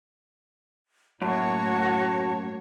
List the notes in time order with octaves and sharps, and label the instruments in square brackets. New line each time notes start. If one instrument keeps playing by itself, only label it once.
[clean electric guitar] F#2 [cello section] A2 A#3 C#5 [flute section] F#4 [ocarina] A5